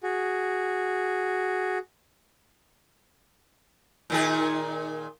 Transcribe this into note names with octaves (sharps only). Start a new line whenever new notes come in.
F#4 G#4
A#2 D#3 G#4